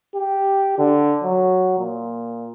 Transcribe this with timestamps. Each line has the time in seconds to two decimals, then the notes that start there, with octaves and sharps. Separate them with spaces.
0.15 G4
0.78 D3
1.23 F#3
1.79 A#2